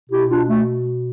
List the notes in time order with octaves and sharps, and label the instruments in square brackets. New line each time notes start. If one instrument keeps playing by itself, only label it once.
[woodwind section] B2 E4 G4
D4 F4
A3